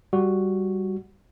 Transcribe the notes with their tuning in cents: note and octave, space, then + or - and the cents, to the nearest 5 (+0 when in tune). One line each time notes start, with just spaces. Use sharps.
G3 -5 F#4 +0